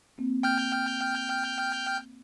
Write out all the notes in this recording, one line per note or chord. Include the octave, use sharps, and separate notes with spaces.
A#3 C4
G5 F6 G6